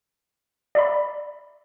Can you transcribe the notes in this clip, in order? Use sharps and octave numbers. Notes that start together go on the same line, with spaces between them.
D5 E5 A#5 B5